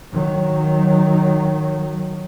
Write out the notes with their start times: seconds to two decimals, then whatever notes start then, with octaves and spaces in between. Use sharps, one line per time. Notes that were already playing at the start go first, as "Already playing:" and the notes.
0.13 D#3 F#3